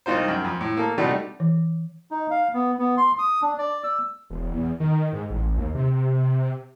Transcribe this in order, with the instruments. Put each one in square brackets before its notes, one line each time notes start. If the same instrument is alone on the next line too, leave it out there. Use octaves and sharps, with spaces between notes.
[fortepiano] C2 D#4 F4 C5
F#2 G5
F2
A2
A#3 A4
C3 G3 A3 D4 D#4 F#4
[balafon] E3
[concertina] D#4
F5
B3
B3
C6
D#6
D4
D5
E6
[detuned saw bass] E1
E2
D#3
G#2
A1
D#2
C3